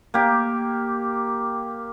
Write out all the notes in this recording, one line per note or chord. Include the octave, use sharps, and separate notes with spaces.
A#3 G4